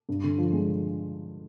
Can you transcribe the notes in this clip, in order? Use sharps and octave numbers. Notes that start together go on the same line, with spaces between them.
G2
D3
F3
G#3